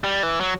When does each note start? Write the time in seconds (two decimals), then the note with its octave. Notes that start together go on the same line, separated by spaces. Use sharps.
0.04 G3
0.23 E3
0.40 F#3